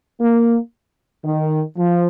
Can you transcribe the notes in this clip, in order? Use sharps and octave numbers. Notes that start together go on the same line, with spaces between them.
A#3
D#3
F3